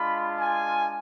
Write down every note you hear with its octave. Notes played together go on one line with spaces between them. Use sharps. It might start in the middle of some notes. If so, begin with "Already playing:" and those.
Already playing: G#3 D4 F4 B5
G#5